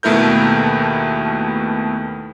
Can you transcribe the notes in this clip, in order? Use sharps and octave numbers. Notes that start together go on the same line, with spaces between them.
D#2 B2 A3 E4 A#4 G6